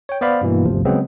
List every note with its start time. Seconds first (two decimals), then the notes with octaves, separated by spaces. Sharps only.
0.09 C#5 G5
0.21 B3 C5 D5 F5 B5
0.41 G2 B2 E3 A#3
0.65 G1 D2 C3 F3
0.85 C#3 F#3 G#3 B3 C4